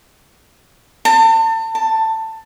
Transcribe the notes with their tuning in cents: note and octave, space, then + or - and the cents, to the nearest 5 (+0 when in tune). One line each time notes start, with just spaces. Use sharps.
A5 +35
A5 +15